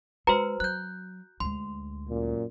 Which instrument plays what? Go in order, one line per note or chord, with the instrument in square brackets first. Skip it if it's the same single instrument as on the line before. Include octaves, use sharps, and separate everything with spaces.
[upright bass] G#3 [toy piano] F#4 A#5 [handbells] B4 C5
[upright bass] F#3 [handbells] F#6 G6
[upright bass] D2 G#3 [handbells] C6
[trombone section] F#2 A#2